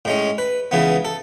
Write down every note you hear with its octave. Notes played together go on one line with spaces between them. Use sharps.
A2 G#3 C#4
B4
C#2 C#3 E3 B3
A4